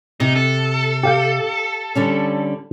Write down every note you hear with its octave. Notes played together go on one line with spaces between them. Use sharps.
C3 D#4
A4
G4 F5 G5
D3 G3 C#4